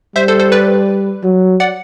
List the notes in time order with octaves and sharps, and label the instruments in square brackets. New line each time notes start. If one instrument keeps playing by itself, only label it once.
[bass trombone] G3 [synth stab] C5 E5
[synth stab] A4 C5
A4 C5
B4 D5
[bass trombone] F#3
[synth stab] D5 F#5